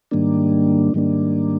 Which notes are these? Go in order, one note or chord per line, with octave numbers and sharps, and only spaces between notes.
G#2 D#3 G3 A#3 D4
G#2 D#3 G3 A#3 D4